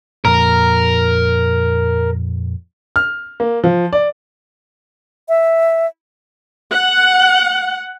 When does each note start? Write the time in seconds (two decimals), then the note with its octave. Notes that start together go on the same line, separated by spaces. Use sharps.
0.25 F2 A#2 A#4
2.96 F6
3.40 A#3
3.64 F3
3.93 D5
5.29 E5
6.71 F#5